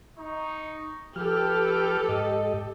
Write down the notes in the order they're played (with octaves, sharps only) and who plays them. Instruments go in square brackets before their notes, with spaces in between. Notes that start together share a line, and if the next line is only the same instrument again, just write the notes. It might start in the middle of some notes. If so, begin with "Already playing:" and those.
[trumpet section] D#4 C#6
[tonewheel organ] F3 F6 [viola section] G4 A4 [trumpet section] B4 G5
[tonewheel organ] G#2 D#5